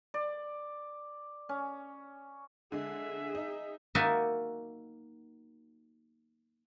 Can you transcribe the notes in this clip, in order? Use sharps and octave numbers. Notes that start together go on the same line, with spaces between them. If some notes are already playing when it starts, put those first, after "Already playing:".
D5
C#4
D3 G#3 G#4 E5
D#4
A#3 D#4 F#4 D5 E5 G#5